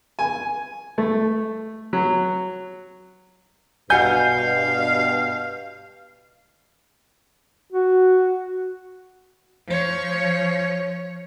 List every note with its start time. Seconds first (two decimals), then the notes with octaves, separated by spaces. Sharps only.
0.19 G#5
0.98 A3
1.93 F#3
3.90 G2 B2 F5 F#5 G#5 G6
7.72 F#4
9.67 F3 C#5